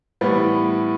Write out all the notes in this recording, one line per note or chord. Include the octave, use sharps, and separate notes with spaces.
A2 E3 G3 B3